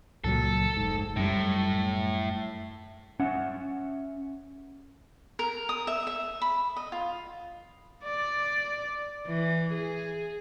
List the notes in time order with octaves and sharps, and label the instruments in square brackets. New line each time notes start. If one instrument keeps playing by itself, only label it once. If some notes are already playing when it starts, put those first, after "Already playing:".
[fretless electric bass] C#2 A#2 F#3 [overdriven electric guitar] A4
[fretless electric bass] F1 G#2
[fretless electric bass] F#2 G3 [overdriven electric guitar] A2
[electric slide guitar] C#4 E5 F#5
[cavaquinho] A#4
D#6
E5
E5
B5
D#5
F4
[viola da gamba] D5
E3
G#4